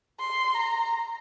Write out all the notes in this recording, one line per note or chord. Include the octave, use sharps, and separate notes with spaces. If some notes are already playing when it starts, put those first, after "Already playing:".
C6
A#5